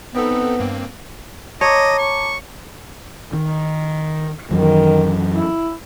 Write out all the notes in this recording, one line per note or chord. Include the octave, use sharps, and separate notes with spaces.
B3 C4 D#4 A4
G2 A#3 C4
C#5 D#5 A5 A#5 D6
C#6
D#3
F#2 D#3 E3 F#3
E4